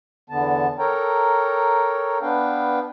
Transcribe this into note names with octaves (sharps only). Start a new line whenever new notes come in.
E2 D3 B3 A5
A4 A#4 C#5 G5 A#5
B3 D4 B4 F5 G5